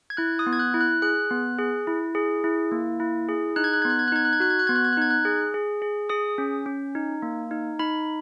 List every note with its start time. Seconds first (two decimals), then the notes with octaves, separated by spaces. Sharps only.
0.10 G#6
0.17 E4 F#6
0.39 D#6
0.46 B3
0.53 G#6
0.59 F#6
0.74 E4
0.81 F#6
1.02 G#4 F#6
1.31 B3
1.58 G#4
1.87 E4
2.15 G#4
2.44 E4
2.72 A#3
3.00 E4
3.29 G#4
3.56 D#4 F#6
3.64 G#6
3.73 F#6
3.82 B3 G#6
3.90 F#6
3.99 G#6
4.08 F#6
4.12 D#4 G#6
4.25 F#6
4.33 G#6
4.40 F#4 F#6
4.50 G#6
4.59 F#6
4.67 B3 G#6
4.76 F#6
4.85 G#6
4.93 F#6
4.97 D#4 G#6
5.11 F#6
5.25 G#4
5.54 G#4
5.82 G#4
6.09 G#4 D#6
6.38 C#4
6.66 C#4
6.95 D#4
7.22 A#3
7.51 D#4
7.79 D#4 B5